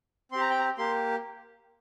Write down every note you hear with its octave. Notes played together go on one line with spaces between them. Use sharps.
C4 G4 C6
A#5
G5
A#5
A#3 G4 C6